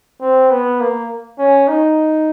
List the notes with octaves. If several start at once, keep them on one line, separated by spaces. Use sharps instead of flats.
C4
B3
A#3
C#4
D#4